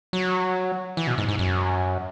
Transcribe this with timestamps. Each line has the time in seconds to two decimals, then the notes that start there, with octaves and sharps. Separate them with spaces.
0.13 F#3
0.97 E3
1.07 B2
1.18 G#2
1.28 G#2
1.39 F#2